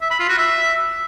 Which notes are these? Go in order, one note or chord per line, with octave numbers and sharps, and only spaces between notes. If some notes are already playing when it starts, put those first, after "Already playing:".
E5
B5
F4
F#4
E5